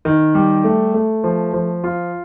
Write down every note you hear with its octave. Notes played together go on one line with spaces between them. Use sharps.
D#3
G3
A3
A3
F3
F3
F4